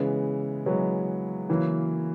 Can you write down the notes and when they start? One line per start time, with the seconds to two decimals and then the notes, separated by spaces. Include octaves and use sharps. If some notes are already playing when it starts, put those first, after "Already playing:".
Already playing: C#3 E3 G#3 B3
0.66 E3 F#3 G#3 B3
1.49 C#3 E3 F#3 A#3